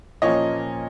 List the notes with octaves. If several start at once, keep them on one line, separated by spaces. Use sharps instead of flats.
A#2 F3 A#3 C#4 C#5 D#5